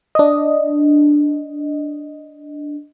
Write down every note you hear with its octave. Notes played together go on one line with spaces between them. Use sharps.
D4 D#5